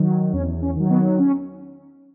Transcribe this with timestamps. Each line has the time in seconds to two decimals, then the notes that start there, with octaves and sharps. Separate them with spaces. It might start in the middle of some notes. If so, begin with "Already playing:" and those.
Already playing: D#3 F#3
0.33 E2 C#4
0.62 C#4
0.76 D#3 F#3
0.90 B3
1.19 C#4